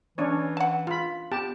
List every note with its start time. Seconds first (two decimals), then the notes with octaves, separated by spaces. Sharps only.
0.18 E3 C#4 D4 C#5
0.57 F#5 A5
0.87 G#3 F4 B5
1.32 B3 G4 A5